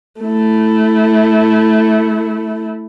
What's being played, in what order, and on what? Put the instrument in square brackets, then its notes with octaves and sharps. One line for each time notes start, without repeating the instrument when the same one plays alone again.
[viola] A3 E4